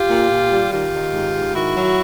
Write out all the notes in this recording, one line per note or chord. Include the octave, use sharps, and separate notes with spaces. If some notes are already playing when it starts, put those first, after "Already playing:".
Already playing: F4 G4
A#2
A#2
G3
D#3 F4 G4
D#3
G#2
G#2
D#3 E4 F#4
F#3